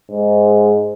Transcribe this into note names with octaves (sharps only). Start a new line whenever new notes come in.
G#2